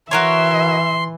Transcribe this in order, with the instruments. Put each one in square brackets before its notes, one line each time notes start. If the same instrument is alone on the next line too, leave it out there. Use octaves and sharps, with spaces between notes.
[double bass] E3 [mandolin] F#4 A#4 C#5 [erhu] E5 [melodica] C6